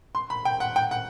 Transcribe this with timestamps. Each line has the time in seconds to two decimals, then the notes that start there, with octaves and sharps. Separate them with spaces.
0.15 C6
0.30 B5
0.45 G5
0.60 F#5
0.76 G5
0.91 F#5